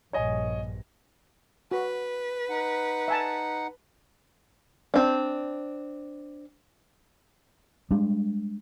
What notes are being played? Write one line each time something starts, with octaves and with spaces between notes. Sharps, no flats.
A#1 G2 C#5 D#5 G#5
F#4 B4
D#4 F#5
E5 G#5 A5
C4 D4
G3 G#3 D4